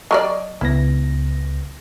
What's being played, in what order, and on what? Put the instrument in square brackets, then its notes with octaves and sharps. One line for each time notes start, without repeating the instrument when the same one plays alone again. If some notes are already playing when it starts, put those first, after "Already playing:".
[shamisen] F#3 A#4 D5 [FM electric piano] D#5
[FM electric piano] C#2 B3 A#6 [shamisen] E4